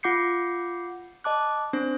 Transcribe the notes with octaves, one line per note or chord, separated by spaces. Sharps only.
F4 F#5 D6 G6 C7 C#7
D#5 A5 D6 F#6
C4 D4 C5